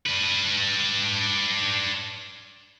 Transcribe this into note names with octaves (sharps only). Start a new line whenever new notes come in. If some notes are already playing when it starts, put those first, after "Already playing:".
D4 B4